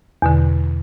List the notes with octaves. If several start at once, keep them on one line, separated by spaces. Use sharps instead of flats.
E2 B2 D3